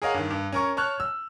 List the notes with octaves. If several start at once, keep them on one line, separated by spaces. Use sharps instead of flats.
G#4 A#4 C#5 D#5 F5 F#5
G2 D#3
G2
C#4 A#4 C#6
C#5 A5 C#6 F6 F#6
E6